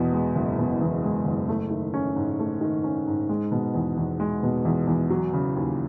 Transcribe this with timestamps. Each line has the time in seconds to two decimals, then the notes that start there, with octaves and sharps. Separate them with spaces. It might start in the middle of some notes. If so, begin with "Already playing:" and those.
Already playing: E2 B2
0.13 G#3
0.35 F#1
0.58 B2
0.81 E2
1.04 G#3
1.25 F#1
1.49 A3
1.71 D#3
1.94 C#4
2.16 G#2
2.39 A3
2.61 D#3
2.84 C#4
3.07 G#2
3.29 G#3
3.52 B2
3.74 E2
3.97 E2
4.20 G#3
4.43 B2
4.65 E2
4.87 E2
5.10 F#3
5.33 C#3
5.56 D#2